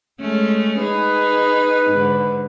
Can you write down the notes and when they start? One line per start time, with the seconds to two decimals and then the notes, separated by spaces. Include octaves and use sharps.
0.20 G#3 A3 C#4
0.78 D#4 G#4 B4
1.90 G#2 D3